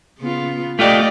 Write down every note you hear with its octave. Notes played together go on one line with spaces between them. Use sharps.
C#3 B3 F4
A3 F4 G4 D5 D#5